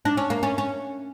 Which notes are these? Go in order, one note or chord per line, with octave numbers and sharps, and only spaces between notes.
D4
C#4
A#3
C#4
C#4